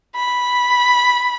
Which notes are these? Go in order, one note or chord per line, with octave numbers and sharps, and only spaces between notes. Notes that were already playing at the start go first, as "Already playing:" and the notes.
B5